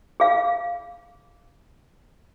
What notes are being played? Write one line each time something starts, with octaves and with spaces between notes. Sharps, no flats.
G#4 F5